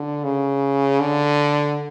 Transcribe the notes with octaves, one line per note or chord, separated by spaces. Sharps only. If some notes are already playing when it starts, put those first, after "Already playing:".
Already playing: D3
C#3
D3